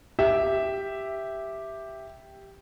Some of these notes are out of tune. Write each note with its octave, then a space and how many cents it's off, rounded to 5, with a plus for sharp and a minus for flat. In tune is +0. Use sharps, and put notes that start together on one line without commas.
G4 +0 E5 +0